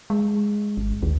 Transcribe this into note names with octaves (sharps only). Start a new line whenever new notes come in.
G#3
G#1
D#2